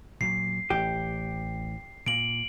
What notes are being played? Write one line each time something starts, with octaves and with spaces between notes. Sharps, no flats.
A#2 F#3 C7
A1 G4
A#2 D7 F#7